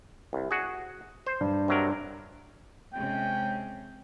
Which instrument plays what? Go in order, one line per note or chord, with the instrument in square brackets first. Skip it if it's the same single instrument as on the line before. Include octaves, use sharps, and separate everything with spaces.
[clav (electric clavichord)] C2
F#4 G#4
C5
[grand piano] G2
[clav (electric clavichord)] C3 F#3 A#4
[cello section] C3 G#3 C#4 [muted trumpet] G5